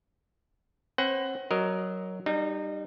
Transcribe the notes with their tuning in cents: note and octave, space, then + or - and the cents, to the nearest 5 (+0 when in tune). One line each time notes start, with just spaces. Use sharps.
C4 +40 B4 +45 F#5 +20
F#3 +10 A#4 +0 D#5 +0
G3 +0 D#4 -30